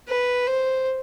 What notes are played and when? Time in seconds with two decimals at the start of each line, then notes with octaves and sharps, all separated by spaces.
0.09 B4
0.47 C5